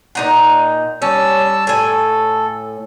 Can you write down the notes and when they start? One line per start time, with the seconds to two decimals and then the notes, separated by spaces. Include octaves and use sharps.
0.15 A#2 D#4 F#5
1.02 G3 C#4 A5 E6
1.67 A2 A4 G#5